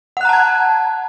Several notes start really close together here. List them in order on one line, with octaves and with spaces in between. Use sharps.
F#5 F#6 A#5 A5 G#6